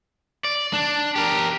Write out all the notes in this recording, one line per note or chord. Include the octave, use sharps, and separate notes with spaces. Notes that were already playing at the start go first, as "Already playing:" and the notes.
D5
D4
G4 A#4